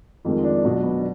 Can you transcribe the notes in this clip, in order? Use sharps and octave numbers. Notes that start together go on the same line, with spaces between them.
F2 D#3 G#3 F4
D4
B2 F#3 D4
B3
D4